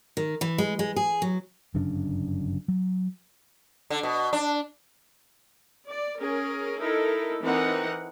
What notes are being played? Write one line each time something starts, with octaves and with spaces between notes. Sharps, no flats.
D#3
E3
G#3
G#3
G#4
F#3
G1 F#2 C#3 D4
F#3
D3
B2
D4
D5
C#4 G#4 A#4
D#4 E4 A4 A#4
E3 C4 D#4 A#4 F#5